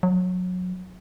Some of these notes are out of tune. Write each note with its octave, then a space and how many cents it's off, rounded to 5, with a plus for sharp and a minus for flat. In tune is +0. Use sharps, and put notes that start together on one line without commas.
F#3 -25